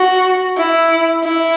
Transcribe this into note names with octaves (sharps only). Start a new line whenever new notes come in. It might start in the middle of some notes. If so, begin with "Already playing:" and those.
Already playing: F#4
E4
E4